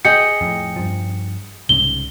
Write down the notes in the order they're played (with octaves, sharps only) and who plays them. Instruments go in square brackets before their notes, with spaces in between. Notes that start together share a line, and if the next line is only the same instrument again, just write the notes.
[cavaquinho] G#4 D#5 G5 [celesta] C#7
[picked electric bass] F2 A2
G2 F3
[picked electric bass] C2 G#2 C#3 [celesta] G7